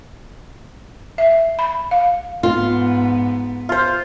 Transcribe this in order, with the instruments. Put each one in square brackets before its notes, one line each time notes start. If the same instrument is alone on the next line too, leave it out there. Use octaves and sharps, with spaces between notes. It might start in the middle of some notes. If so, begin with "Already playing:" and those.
[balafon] E5
B5
F5
[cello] G#2 B3 [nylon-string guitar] F4
[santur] F4 C5